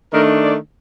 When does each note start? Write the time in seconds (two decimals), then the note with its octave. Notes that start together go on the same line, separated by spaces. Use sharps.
0.12 D#3 A3 D4 A#4
0.44 D5